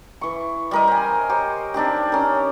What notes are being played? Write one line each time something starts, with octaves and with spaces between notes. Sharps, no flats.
E3 C#6
G3 A#4 D#5
C5 G#5
G4 C5 C#5
C4 D4 D#4 G4
C#4 A#4